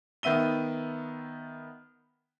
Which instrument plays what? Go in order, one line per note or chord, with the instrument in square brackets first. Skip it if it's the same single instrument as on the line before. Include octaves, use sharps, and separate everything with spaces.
[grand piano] D#3 B3 E5 D#7 G7